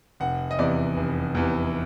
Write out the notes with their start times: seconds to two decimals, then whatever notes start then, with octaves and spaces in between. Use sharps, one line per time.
0.20 F1 F#5
0.51 D#5
0.59 E2 C3 E3 D5
0.97 F1
1.35 E2 C3 E3